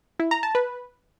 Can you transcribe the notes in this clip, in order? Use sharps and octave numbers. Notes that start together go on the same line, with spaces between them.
E4
A#5
A5
B4